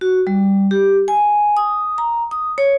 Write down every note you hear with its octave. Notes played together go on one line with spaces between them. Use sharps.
F#4
G3
G4
G#5
D#6
A#5
D#6
C#5